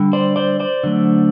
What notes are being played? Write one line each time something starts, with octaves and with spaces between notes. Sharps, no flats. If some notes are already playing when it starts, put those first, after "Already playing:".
Already playing: D3 G3
C5 D5
C5 D5
C5 D5
D3 F#3 A3